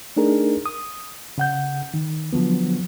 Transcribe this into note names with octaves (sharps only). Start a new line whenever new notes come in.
A3 D4 D#4 G#4 A#4
D#6
C#3 F#5 G6
D#3
D3 F3 F#3 B3